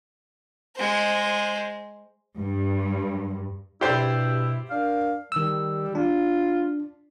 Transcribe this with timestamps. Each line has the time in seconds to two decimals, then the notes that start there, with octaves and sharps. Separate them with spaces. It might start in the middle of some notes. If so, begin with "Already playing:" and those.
0.76 G#3 C5
2.38 G2
3.81 G2 B2 E4 G4 C5 D5
4.70 D4 A#4 F5
5.32 D#3 G3 E6
5.95 D4 F4